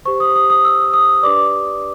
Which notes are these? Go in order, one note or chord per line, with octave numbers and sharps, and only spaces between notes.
G4 C5 C#6
D#6
D#6
D#6
E6
D#6
D4 G4 B4 D5 D6